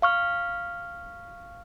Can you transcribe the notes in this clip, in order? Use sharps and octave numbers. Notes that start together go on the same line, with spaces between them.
F5 C#6 F6